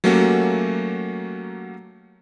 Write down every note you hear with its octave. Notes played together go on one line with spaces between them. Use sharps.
F#3 A3 A#3 C#4 F#4 G4